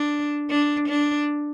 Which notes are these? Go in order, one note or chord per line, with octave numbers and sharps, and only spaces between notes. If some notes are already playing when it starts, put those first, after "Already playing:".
Already playing: D4
D4
D4